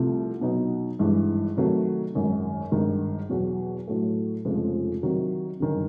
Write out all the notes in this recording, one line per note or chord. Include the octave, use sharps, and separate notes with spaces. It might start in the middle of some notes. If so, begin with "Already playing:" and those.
Already playing: C2 C3 F3 A3
B2 F#3 B3 D#4
G#1 G2 E3 G#3
C3 D#3 F#3 A3
G#1 F#2 D#3
G#1 G2 D#3
E2 B2 F#3
A2 F#3 A3
F1 F2 C#3 F3 G#3
C3 D#3 F#3
G1 F#2 D#3